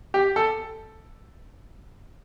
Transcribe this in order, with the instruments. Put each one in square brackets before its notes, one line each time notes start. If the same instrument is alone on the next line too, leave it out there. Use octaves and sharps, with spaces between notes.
[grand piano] G4
A4